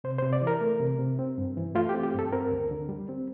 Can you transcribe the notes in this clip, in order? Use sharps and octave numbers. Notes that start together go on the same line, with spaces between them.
C3 C5
C5
C3
D5
E3
A#4
A3
C3
C3
C4
G2
E3
A3 F4
G4
C4
G4
G2 A4
C4 A#4
D2
D3
G3
C4